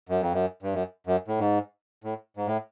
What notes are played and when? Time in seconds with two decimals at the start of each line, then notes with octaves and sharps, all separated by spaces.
0.09 F#2
0.21 F2
0.33 F#2
0.62 G2
0.73 F#2
1.07 F#2
1.28 A2
1.39 G#2
2.04 A2
2.37 G#2
2.47 A2